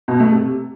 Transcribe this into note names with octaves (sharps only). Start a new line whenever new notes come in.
B2
A3
C3